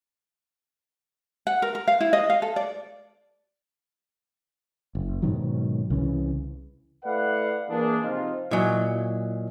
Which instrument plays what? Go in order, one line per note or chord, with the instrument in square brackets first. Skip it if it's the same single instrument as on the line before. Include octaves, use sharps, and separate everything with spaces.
[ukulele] F#5
A#4
A#4
F5
E4
D#5
F5
A4
D5
[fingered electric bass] F#1
G#2 B2 D#3 F#3
C2 C#3 E3
[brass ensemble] A3 E4 B4 D5 F5 F#5
E3 A#3 D4 G#4
C3 F3 C4 D#4 F4
[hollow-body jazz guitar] A#2 F#3 [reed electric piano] E4 D#5 G#5